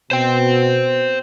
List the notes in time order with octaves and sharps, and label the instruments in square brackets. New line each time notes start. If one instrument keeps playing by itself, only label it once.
[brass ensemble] B2 [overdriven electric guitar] C5 G5